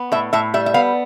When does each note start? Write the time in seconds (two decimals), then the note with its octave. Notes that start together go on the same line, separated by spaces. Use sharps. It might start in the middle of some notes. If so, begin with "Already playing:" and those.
Already playing: B3
0.12 A2 E5
0.33 A2 E5
0.54 G3 E5
0.66 E5
0.74 B3 F5